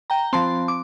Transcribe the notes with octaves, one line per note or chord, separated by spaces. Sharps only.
G5 A#5
F3 C4 A5 C6
D6